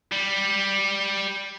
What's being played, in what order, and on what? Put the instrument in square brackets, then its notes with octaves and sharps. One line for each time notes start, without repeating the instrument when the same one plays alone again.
[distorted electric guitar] G3